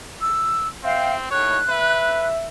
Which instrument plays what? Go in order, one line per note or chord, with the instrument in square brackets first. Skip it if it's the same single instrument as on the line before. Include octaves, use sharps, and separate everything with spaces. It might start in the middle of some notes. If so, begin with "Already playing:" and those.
[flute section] E6
[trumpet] C4 [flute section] E5 F5 G5
[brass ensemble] D#2 A2 [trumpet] C#5 [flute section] F#6
[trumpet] B4 [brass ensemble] E5